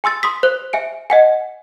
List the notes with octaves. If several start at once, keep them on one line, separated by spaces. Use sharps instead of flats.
G#5 C6 E6 A6
C6 D#6 B6
C5 F#6 F7
E5 G#5 D7
D#5 F#5 G#5